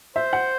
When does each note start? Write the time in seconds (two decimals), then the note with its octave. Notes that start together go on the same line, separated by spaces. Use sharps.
0.16 C5 E5
0.33 F#5